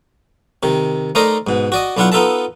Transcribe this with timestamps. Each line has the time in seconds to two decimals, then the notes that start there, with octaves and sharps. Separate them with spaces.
0.63 C3 D#3
1.15 A3 D#4 A#4 C5 D5 D#5
1.47 G#2 B2
1.72 F#4 D5 D#5
1.97 B1 D4 E4 F4 F#5 C#6
2.12 B3 D#4 F4 A4 E5 A5